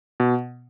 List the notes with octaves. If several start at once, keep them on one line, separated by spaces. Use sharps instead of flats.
B2